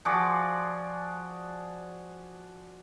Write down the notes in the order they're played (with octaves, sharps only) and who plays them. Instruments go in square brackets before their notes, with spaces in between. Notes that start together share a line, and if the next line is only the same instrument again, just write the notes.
[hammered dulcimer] F3 F#4 G#4 D5